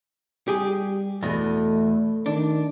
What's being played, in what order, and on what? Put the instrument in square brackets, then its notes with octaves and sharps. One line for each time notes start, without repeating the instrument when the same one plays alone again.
[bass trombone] G3 [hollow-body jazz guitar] G4 G#4
[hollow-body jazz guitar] E2 B2 [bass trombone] A3
[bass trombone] D#3 [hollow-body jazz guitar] D4